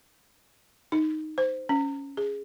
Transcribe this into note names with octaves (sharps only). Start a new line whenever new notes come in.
D#4
C5
C#4
G#4